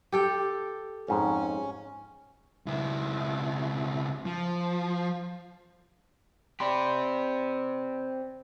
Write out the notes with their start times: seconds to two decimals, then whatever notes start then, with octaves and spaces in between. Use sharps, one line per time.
0.12 G4 A4 G5
1.08 F2 G#2 C#4
2.66 C#2 E4
4.25 F3
6.60 C4 G4 D5 B5 C6